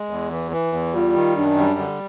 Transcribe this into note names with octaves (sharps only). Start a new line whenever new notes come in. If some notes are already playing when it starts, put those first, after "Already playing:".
Already playing: G#3
E2
E3
E3
E2
G3 F4
D#3
F#2 D4
G3
D3